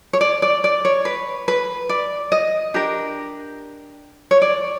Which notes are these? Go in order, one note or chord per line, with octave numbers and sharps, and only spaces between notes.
C#5
D5
D5
D5
C#5
B4
B4
D5
D#5
D4 G4 A#4
C#5
D5